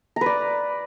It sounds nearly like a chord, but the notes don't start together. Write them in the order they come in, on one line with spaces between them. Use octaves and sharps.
A#5 B4 D5